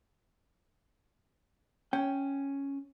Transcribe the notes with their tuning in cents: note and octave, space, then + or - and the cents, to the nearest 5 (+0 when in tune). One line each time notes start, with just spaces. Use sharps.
C#4 +0 G5 +0